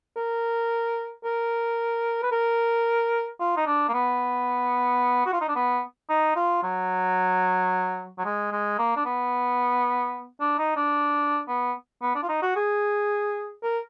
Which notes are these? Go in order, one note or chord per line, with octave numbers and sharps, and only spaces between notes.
A#4
A#4
B4
A#4
F4
D#4
D4
A#3
B3
F#4
F4
D#4
D4
B3
D#4
F4
F#3
F#3
G#3
G#3
A#3
D4
B3
D4
D#4
D4
B3
B3
D4
F4
D#4
F#4
G#4
A#4